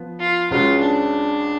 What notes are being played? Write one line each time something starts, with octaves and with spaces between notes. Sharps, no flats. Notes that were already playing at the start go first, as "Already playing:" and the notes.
Already playing: F3 B3
F4
C#2 C#3 G#3 C#4 F4 F#4
D4